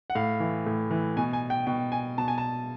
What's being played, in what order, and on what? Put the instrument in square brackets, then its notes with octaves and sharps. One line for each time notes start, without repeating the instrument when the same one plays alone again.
[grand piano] F#5
A2 F5
E3
A2
E3
B2 G#5
G#5
G5
B2 G5
G#5
B2 A5
G#5
A5